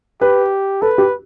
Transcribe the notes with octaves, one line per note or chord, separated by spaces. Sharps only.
G4 B4
A4 B4
G4